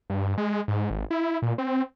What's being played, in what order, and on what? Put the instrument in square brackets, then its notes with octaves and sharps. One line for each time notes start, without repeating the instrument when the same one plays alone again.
[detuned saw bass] G2
G#3
G#2
G#1
E4
A#2
C4